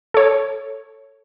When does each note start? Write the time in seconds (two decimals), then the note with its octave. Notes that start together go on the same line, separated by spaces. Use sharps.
0.14 A4 C#5